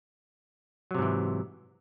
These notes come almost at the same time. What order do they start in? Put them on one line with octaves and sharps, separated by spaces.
F#3 C3 G#2 E3